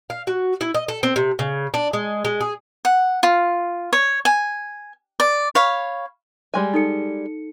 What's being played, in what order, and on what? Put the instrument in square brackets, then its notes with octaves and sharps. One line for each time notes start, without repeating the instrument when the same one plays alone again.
[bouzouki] F5
F#4
E4
D#5
A4
C4
C3
C#3
D4
G#3
G#3
G#4
[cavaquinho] F#5
F4
C#5
G#5
D5
C#5 F5 B5
[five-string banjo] G3 G#3 G#5
[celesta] D#4 A4 C#7